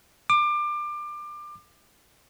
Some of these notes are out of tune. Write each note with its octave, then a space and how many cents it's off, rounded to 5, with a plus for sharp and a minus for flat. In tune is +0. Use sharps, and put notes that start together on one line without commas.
D6 +25